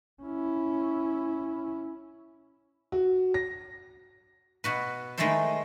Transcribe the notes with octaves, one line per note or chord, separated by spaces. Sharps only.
C#4 E4
F#4
A#6
B2 F#4 B4
D#3 G#3 A3 E4 A4 C5